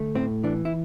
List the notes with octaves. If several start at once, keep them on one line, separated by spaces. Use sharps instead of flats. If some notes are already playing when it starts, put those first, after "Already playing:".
Already playing: D2 A3
A2 C4
E3 D4
E4